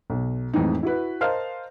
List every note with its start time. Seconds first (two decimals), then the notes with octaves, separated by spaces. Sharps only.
0.10 B1
0.54 F2 A2 E3 G#3 D#4
0.83 E4 F#4 B4
1.21 A#4 C5 D#5 F5 A5 F6